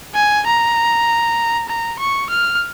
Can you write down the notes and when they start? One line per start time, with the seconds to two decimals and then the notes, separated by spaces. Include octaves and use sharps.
0.15 G#5
0.46 A#5
1.69 A#5
1.99 C#6
2.30 F6